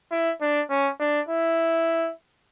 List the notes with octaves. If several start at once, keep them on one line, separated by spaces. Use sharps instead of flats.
E4
D4
C#4
D4
E4